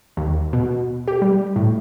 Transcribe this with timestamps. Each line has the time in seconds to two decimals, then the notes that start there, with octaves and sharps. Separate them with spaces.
0.17 D#2
0.53 B2
1.08 G4
1.22 G3
1.56 A2